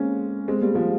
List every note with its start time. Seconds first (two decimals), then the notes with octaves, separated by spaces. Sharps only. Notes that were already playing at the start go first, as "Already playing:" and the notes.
Already playing: G#3 A#3 C4 C#4
0.48 G#3 C4
0.62 G3 A#3
0.74 F3 G#3